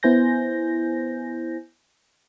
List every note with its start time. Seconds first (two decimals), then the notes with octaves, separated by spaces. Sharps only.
0.03 B3 E4 C5 G#5 G6 A#6